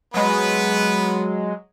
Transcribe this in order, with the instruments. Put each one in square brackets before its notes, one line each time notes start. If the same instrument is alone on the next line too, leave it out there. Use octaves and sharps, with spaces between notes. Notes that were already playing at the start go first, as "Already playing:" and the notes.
[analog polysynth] F#3 G#3 [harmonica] B3 B4